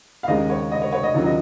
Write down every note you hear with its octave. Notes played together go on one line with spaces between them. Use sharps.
F5
D#2 D#3 G#3 C#4 D#5
C#5
D#5
C#5
C#5
D#5
D#2 D#3 F#3 C#4 F4
D#5